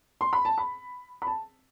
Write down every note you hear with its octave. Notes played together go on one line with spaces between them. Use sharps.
C6
B5
A5
B5
B5
A5